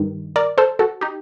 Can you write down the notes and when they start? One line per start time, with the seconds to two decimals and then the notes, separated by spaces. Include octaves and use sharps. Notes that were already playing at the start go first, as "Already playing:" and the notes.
Already playing: G2 D#3
0.36 A#4 D5
0.58 A4 C5
0.79 F#4 A4
1.01 D#4 G4